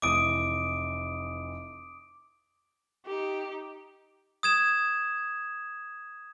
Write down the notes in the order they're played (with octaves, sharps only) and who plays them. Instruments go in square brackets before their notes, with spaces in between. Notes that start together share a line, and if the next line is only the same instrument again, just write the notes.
[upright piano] F1 E3 D#6 [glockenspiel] D6 D7
[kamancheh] D#4 G4
[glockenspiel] D#6 G#6 E7